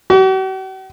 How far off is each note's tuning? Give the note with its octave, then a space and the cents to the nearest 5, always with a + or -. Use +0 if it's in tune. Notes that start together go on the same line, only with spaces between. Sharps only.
F#4 +45